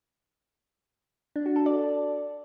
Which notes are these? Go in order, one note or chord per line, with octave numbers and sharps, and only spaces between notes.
D4
F#4
A4
D5